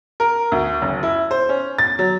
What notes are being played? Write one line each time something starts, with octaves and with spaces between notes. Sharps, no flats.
A#4
D2
F#1
E4
C5
C#4
A6
F#3